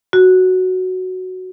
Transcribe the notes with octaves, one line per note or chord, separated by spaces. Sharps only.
F#4